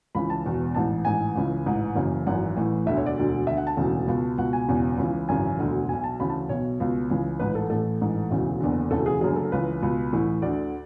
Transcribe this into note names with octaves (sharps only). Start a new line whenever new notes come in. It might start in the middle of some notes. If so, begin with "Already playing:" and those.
C#2 C#3 E3 B5
A5
E1 E2 B2
A1 G#2 E3 A5
A1 G#2 E3 G#5
C#2 C#3 E3
A1 G#2 E3
F#1 F#2 C#3 E3
G#1 F#2 E3 F#5
A1 A2 E3
E1 D2 D3 E5
C#5
D5
E1 D2 D3
D2 D3 E5
F#5
A5
E1 D2 C#3 E3
C#2 B2
C#2 B2 F#5
G#5
E1 E2 C#3 E3
C#2 C#3 E3
G#1 F#2 C#3 E3 G#5
E1 D2 D3
B1 B2 G#5
A5
D2 C#3 E3 B5
A5
B1 B2 C#5
C#2 B2
C#2 C#3 E3
A1 G#2 E3 B4
A4
A1 A2 E3 A4
A1 G#2 E3
E1 D2 C#3 E3
F#1 E2 D3
E1 D2 C#3 E3 A4
G#4
F#1 F#2 D3 G#4
A4
C#2 C#3 E3 B4
C#2 B2
A1 A2 E3
D2 D3 D5